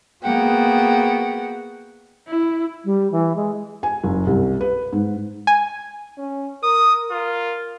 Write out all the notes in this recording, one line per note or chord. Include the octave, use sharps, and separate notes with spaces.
A#3 B3 F#4 G#4 F#5 G5
E4
G3
E3
G#3
G#5
F#1
C2
B4
G#2
G#5
C#4
A#4 D#6
F4 A#4